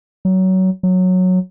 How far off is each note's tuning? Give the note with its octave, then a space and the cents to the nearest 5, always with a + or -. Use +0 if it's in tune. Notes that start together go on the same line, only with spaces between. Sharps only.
F#3 +20
F#3 -10